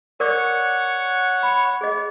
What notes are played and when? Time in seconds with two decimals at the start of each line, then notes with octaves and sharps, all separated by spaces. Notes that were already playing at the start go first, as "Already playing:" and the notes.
0.20 A#4 C#5 D5 F#5 C#6 D6
1.43 B5
1.81 G#4 D#5